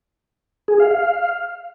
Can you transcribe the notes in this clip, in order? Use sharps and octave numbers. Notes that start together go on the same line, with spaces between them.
G#4
F5
F5